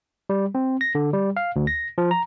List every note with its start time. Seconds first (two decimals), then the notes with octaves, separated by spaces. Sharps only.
0.30 G3
0.55 C4
0.81 A#6
0.95 D3
1.13 G3
1.37 F5
1.56 D2
1.67 A#6
1.98 F3
2.11 A#5